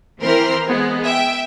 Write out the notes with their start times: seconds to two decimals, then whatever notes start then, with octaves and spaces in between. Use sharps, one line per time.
0.21 E3 C4 A#4 C6 F6
0.67 G#3 B3
1.06 E5 G5